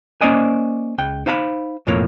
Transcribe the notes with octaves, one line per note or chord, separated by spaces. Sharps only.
A#3 C#4 C5 D5 D#5 G#5
C#2 G5
D#4 C5 F5 A#5 B5
B1 F2 A2 F3 A#3 C#5